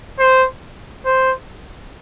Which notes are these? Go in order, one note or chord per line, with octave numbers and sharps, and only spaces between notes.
C5
C5